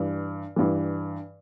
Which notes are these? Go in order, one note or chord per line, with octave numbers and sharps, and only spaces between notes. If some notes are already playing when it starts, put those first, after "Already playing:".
Already playing: G2 E3
G2 E3